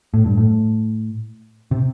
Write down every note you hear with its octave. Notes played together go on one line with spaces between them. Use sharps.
A2
G2
A2
C3